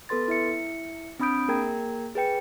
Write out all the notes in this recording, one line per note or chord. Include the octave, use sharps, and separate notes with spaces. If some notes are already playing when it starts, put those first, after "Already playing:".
B3 A4 B4 C6 A6
E4 E5 C#7
C4 D4 B5 D#6 G6 D7
A#3 G#4 A#4 G5 A#5 G#6
G#4 B4 G5 C#7